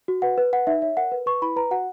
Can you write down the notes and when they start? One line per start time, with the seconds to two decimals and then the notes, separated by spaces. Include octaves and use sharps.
0.08 F#4
0.22 B4 F#5
0.38 B4
0.53 B4 F#5
0.67 D#4 E5
0.82 C#5 E5
0.97 A#4 F#5
1.12 B4
1.26 B4 C#6
1.42 E4 B5
1.56 B4 A#5
1.71 F#4 F#5